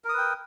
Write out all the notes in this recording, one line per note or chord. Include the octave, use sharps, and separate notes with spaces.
A#4 B4 G5 D#6